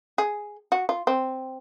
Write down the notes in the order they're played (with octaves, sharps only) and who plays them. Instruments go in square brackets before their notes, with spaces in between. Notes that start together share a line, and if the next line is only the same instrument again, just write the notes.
[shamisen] G#4
F#4
F4
C4